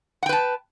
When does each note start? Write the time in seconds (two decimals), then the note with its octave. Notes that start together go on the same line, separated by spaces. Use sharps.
0.23 F#5
0.26 G5
0.29 B4
0.33 A5